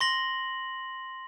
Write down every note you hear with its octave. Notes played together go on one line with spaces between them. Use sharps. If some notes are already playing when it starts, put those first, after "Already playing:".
C6 A#6 F#7